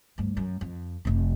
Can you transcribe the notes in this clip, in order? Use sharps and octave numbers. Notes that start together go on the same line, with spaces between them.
D2 G2
F#2
F2
F1 C3